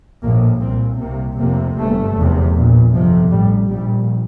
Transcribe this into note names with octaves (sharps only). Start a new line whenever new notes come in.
A#1 A2 A#3
C2 A#2 C4
C2 C3 A#3
F1 F2 C3 A#3
G1 G2 A3
F1 E2 C3
A#1 A#2
G1 F2 C3 F3
A1 A2 G3
A#1 A#2 G3